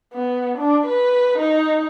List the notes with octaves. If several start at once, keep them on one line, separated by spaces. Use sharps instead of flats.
B3
D4
B4
D#4